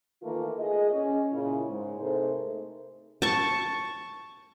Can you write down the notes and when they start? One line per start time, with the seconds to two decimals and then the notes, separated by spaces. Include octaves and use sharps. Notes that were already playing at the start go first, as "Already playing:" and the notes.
0.22 D#3 E3 A3 A#3 F4
0.59 G#4 D#5
0.91 C#4
1.32 A#2 C#3 E4
1.67 G#2
1.99 C3 A3 D#4 G#4 A#4 C5
3.22 A5 C#6